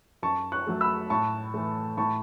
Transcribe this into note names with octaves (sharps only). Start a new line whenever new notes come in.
F#2 A5 C#6
C#6 F#6
F#3 A3
B5 E6
A2 A5 C#6
E3 A3
A2 A5 C#6